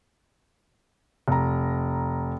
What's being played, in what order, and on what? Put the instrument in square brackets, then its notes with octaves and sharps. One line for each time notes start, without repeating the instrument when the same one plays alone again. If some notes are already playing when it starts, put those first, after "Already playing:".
[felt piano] F1 A#5